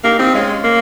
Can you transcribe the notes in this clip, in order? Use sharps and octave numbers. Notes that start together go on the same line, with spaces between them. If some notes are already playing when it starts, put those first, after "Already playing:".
A#3 D#4 G4
C4 D#4 G4
G#3 C#4 F4
A#3